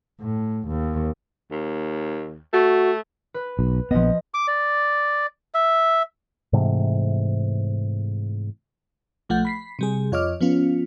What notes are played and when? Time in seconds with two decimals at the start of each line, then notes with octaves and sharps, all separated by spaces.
0.21 A2
0.68 D#2
1.51 D#2
2.53 A3 F#4
3.34 B4
3.59 B1
3.91 A#1 F3 B3 D#5
4.34 D6
4.48 D5
5.54 E5
6.53 G#2 C3 E3 A3
9.29 B1 F3 A3 F#5 G6
9.45 B5 B6 C7
9.79 C3 G3 G#4
10.12 F2 F4 C#5 D#5 D6 F6
10.41 F3 B3 C#4 F4